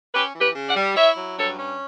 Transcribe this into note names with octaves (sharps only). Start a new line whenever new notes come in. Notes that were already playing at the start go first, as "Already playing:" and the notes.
C#4 G4 B4
E3
G4 B4
C#3
D5 F#5
G3
E4 C#5 E5
F#3
G2 A4 C#5
C#4